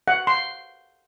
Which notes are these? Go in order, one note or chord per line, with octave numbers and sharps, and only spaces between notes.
F#5
C6